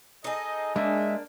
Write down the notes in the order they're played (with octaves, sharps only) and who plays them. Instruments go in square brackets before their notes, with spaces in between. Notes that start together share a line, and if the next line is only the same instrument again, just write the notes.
[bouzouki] D#4 G#4 [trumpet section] A4 D#5
[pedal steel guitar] G#3 [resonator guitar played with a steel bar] A#3 D4 [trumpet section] E5